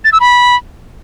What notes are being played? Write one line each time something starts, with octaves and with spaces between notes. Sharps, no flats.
A6
E6
B5